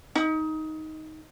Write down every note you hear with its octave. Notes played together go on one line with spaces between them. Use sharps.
D#4